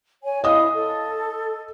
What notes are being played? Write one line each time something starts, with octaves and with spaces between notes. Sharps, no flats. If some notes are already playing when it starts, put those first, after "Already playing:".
C#5 G#5
E4 D#5 F5 D#6
A4